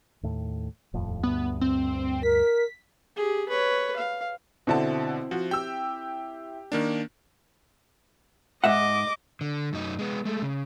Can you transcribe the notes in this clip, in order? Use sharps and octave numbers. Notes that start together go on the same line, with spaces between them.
D#2 A2
D#1 F2 A2
D2 G2 B3
C4
A#4 B6
G4 G#4
B4 C#5
F5
B2 D3 C4 E4 A5
F3 F#4
G4 G5 E6
D#3 A#3 D4
G#2 D#5 E5 F#5 D6
D3
F#2 D#4
G#3 B3
G#3 A3
C#3